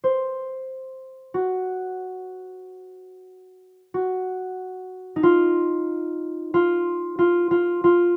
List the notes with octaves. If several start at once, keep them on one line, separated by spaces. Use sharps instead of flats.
C5
F#4
F#4
D#4
F4
F4
F4
F4
F4